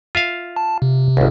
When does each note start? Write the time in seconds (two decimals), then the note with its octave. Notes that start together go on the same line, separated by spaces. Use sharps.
0.15 F4 E5 F5
0.56 A5
0.82 C3
1.17 G1 C#2